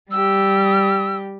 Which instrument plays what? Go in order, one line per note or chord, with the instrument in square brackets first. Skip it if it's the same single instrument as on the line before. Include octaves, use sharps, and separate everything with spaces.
[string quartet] G3 G4 [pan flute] E6